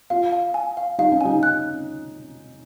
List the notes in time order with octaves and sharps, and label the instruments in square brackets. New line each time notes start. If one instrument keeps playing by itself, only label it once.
[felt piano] F4 [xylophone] F5
[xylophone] F5
G#5
F5
[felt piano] D#4 [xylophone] F5
[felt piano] C#4
[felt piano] D#4 [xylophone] G#5
[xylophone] F#6